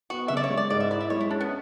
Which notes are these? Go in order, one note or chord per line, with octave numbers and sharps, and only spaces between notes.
B3 F#4
C#3 E5
D5
C#5
G#3
D5
G#2 D5
E5
E4 D5
E5
G#3 C#5
E4
C#4 D4
B3